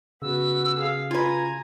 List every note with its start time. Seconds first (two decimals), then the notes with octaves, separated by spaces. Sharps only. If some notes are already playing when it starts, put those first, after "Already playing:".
0.22 C#3 B3 F#4 E6
0.76 G#4 F5
1.11 F4 B4 G#5 A#5 G#6